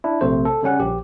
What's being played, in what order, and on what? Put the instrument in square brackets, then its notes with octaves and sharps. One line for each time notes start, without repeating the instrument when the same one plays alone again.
[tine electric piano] D4 E4
A#1 C3 A3 C5
A4
C#3 G3 C#4 F#5
A#1 G4